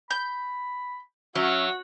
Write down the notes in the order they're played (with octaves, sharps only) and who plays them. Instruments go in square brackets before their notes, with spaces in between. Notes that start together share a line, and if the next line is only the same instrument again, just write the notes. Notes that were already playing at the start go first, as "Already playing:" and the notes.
[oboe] B5 [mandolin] G6
[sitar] F#3 [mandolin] C#4 [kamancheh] F#4 [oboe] E5